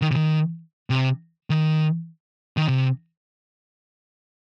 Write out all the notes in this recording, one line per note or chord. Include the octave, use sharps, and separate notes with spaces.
D#3
C3
D#3
C3
D#3
D#3
C3